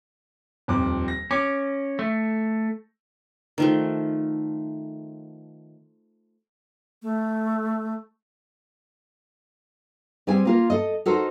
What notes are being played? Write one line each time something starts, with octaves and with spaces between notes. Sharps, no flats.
D#1 F2 D6
A#6
C#4 D6
A3
D#3 F3 A3
A3
G3 C4 G4 G#4 G#5
A#3 F4 A#4
A4 D#5
D#4 F#4 A4 A#4 C5